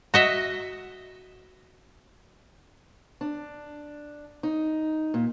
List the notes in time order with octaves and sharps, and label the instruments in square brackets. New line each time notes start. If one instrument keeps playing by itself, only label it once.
[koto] F#4 D#5 E5
[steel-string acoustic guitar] D4
D#4
A#2